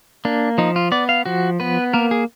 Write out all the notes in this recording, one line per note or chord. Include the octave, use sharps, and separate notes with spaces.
A#3 D4
F3 D#4
F4
B3 D5
F5
F3 F#4
B3 B4
A#3 A#4
G#4